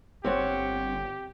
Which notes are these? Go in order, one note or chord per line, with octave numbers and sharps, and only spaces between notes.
G1 C4 G4 C#5 F#5